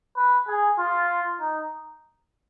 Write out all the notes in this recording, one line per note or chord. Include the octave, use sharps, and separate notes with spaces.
B4
G#4
F4
D#4